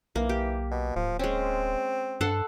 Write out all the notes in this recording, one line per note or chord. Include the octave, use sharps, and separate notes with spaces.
B1 E3 A#3
G4
B2
D1 F3
G#3 C4 C#4
G2 A4 F#5 C6